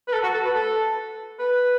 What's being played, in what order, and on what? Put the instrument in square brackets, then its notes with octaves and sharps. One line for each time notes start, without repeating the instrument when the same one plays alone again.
[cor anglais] B4
A4
F#4
A4
B4
A4
B4